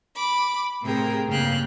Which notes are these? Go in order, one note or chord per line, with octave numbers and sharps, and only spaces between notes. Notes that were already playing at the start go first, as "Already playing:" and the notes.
B5 D6
A2 C3 G#4 A#4 G5
G2 C#3 A#3 F5 G5 F#6